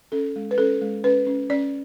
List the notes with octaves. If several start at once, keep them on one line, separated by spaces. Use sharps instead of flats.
C#4 A4
G#3
B4
C#4 A4
G#3
C#4 B4
C#4
C#4 D5